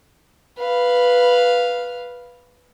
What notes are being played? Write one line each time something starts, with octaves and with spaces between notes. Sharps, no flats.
B4 F5